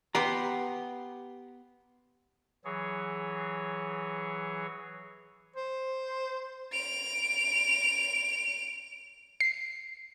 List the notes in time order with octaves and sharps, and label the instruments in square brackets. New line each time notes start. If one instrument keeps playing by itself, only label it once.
[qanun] B3 C6 [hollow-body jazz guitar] G4 B4 A#5
[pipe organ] E3 F#3 G#4 C#5
[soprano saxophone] C5
[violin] D7 F7
[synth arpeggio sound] C7